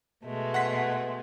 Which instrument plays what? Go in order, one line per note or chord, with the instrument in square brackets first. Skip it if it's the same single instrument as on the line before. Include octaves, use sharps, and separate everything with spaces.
[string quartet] B2 G#3 A3
[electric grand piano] F#5 C6 B6